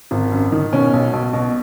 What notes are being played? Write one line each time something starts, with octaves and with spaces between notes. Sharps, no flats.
G#1
F#2
D#3
B2 C#4
B1
B1
B2